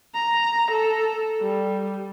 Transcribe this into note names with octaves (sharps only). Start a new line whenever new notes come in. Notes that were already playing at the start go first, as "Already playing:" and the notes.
A#5
A4
G3